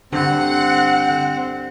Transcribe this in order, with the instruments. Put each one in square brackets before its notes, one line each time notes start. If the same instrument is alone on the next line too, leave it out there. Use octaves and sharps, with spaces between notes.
[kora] G2 [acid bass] D3 [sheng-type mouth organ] C4 [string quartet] F#5